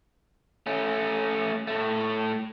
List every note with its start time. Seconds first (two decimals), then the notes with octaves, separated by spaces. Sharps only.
0.67 A3 C#4
1.67 A2 A3